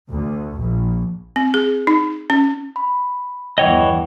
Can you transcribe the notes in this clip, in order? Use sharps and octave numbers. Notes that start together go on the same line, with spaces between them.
D2
A#1
C4
G#4
D#4
C#4
B5
G1 E2 E3 C#5 D#5 F#5 G5